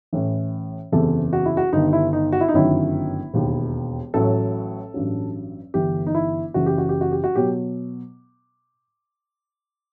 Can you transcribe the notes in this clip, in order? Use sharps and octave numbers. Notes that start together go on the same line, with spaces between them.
A1 A2 E3
F#1 E2 C3 E3 A4
F#4
E4
F#4
G1 G2 D#3 D#4
E4
D#4
F#4
E4
D#4
G1 F#2 D#3 F#3 E4
E1 D#2 D#3
A1 A2 F#3 A4
A1 G2 F#3
G1 G2 E3 G4
D#4
E4
F#1 F#2 E3 F#4
G4
F#4
G4
F#4
G4
F#4
B2 F#3 G4